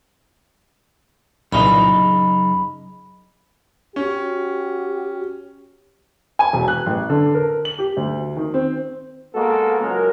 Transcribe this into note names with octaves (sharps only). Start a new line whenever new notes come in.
C2 F#2 A#2 C#3 E3 D#4 B5
C#4 F#4 G4
G#5
E1
F#6
A1
D3
A#4
F#7
G4
D2
D#3
C4
G#3 A#3 B3 F#4 A4
C#2 F#3 G#3 A#4